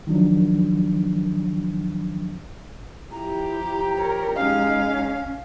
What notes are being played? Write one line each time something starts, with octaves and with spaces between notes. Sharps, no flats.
D#3 F3 F#3 D4
F3 E4 G4 A#5
A#4 C#5
G#3 C#4 D#4 F5